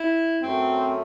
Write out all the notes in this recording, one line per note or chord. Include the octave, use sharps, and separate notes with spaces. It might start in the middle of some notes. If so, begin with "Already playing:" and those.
Already playing: E4
F#2 F#3 A3 C4